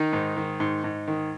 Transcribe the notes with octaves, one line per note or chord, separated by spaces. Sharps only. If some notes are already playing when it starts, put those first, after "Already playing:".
Already playing: D#3 D#4
G#2
D#3
G#2
G#2
D#3